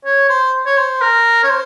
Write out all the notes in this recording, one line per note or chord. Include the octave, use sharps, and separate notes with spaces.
C#5
C5
C#5
C5
A#4
C#5
C5